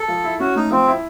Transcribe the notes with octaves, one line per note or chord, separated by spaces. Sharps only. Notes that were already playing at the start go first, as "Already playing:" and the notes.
Already playing: A4
F3
E4
C#4 F#4
A3 D#4
F3 C4
E4